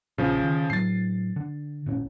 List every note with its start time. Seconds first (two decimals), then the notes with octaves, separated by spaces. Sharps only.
0.18 A#1 A#2 C#3 F3
0.43 D#3
0.70 A2 F#3 A6 C7
1.36 D3
1.86 G#1 A#2 C#4